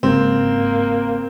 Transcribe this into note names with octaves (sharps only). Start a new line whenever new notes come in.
G1 G#2 C#3 A#3 C4